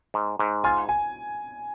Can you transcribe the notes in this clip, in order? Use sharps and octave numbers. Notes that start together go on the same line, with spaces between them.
G#2
G#2
F4 G#5
G#5